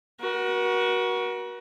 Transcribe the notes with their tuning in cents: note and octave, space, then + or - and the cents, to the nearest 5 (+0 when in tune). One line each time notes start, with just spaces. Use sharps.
F#4 +5 A#4 +40